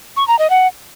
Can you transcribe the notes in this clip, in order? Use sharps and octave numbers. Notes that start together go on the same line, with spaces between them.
C#6
A#5
D#5
F#5